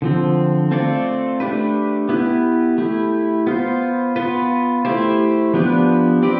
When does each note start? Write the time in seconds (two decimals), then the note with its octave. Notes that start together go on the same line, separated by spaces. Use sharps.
0.02 D3 F3 C4
0.71 A3 C4 F4 A4 D5
1.40 A3 D4 G4 B4
2.09 B3 E4 G4 B4
2.78 A3 E4 G4
3.47 B3 F4 C5
4.16 B3 F4 B4
4.85 A3 E4 G4 C5
5.54 F3 B3 D4 G4 B4
6.22 C4 G4 B4 D5